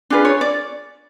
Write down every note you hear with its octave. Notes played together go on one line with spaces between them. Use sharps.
D4 F4 G#4 B4
C#5
D5